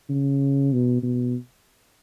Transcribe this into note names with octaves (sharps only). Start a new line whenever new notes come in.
C#3
B2
B2